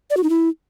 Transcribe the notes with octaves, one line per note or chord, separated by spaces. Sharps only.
D5
F#4
D#4
E4